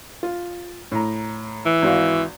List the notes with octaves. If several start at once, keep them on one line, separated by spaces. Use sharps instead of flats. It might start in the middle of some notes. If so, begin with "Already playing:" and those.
F4
A2 A#5
E3
G#1 F#4 F5